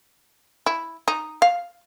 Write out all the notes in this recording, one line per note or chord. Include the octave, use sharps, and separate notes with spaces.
E4
D#4
F5